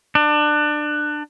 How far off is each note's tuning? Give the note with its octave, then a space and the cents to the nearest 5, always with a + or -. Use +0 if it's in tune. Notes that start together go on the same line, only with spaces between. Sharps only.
D4 +25